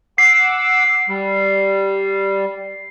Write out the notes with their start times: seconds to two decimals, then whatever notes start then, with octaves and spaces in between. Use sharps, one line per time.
0.18 F#5 D6 E6 C7
1.09 G3